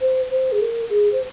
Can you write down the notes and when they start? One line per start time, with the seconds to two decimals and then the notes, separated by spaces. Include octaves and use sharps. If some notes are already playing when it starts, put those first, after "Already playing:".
0.01 C5
0.31 C5
0.52 G#4
0.61 A#4
0.90 G#4
1.12 C5